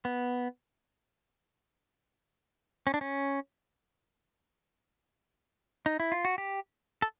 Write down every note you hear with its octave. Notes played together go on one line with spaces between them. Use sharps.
B3
C#4
D4
C#4
D#4
E4
F4
F#4
G4
A4